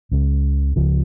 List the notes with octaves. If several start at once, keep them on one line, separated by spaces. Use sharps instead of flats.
C#2 C#3 G#3
C#2 C#3 F3